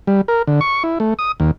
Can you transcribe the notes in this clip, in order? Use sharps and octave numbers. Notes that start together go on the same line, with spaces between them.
G3
A#4
D3
C#6
E4
A3
D#6
D#2